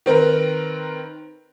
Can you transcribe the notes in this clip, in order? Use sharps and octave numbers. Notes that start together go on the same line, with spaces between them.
D#3 C4 A#4 B4